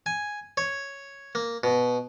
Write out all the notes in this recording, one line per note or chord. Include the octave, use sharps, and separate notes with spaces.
G#5
C#5
A#3
B2